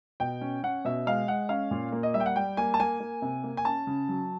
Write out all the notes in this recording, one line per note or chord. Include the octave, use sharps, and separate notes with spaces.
B2 G5
C#4
C#4 F#5
B2 E5
G#3 F5
G#3 F#5
C#4 F5
A#2
A#3
D#5
G3 E5
G5
F#5
G3 G5
A#3 G#5
A5
A#3 G#5
A#3
C3
A#3
G#5
C#4 A5
C#3
F#3